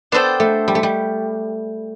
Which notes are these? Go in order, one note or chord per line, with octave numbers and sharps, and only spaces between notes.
B3 D4 A4 C5 G5
A3
G3
A3
G3